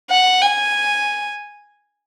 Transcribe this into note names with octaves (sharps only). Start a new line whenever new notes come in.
F#5
G#5